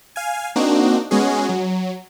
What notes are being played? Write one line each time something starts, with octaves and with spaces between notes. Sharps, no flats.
F5 G#5
A#3 C4 D4 D#4 F#4
G#3 B3 C#4 F#4 G#4
F#3